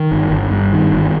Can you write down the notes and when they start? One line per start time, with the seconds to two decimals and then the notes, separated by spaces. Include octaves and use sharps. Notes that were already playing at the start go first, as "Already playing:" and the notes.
Already playing: D#3
0.11 G1
0.31 G1
0.52 G2
0.73 D#3
0.93 G1